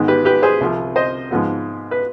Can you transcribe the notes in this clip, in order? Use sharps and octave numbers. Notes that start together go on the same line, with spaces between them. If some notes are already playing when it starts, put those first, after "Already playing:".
Already playing: G#2 D#3 B3
G4 B4
G4 B4
G#4 C5
C2 C3 F3
C5 D#5
G#2 F3 B3
B4